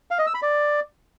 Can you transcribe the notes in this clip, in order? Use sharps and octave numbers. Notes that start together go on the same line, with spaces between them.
F5
D#5
E6
B5
D5